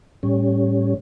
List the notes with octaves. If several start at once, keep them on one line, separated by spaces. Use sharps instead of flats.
A2 G3 C#4